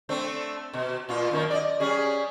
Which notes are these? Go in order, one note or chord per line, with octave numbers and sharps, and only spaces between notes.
A3 C4 D4
B2
A#2 F4
F#2 D#3 A#3
D5 D#5
G3 C#4 G#4